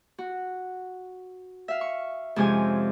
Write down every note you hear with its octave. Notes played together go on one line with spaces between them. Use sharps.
F#4
E5 F5
C#6
F2 C3 G#3 C#4 C5 G#5